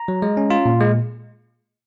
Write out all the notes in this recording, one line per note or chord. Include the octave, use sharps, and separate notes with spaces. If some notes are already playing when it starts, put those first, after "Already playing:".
Already playing: A#5
F#3
G#3
C#4
F4
A#2
G#3